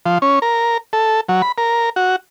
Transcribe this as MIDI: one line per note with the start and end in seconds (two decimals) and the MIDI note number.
0.06 0.18 53
0.22 0.39 61
0.42 0.77 70
0.93 1.21 69
1.29 1.42 54
1.42 1.52 83
1.58 1.90 70
1.96 2.16 66